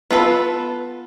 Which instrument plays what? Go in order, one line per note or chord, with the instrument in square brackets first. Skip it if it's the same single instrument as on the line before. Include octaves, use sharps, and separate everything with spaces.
[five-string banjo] B3 F4 A4 B4